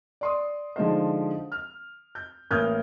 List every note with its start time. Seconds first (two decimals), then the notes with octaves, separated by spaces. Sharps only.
0.21 D5 C6 D#6
0.76 D3 F3 G#3 D#4 F4 C5
1.52 F6
2.15 G6
2.51 A1 A#3 D#6 F6 G6 G#6